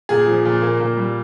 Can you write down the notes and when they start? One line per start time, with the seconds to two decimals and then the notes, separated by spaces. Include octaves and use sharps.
0.09 A#2 G#4
0.27 F3
0.45 A#2
0.62 A#3
0.80 A#2
0.97 G3